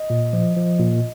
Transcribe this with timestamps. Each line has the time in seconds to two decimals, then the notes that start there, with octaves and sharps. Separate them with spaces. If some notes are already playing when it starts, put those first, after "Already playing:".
Already playing: D#5
0.10 A#2
0.33 F3
0.57 F3
0.80 A#2